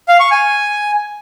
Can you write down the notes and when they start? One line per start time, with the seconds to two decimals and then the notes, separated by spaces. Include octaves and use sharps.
0.08 F5
0.20 C#6
0.31 G#5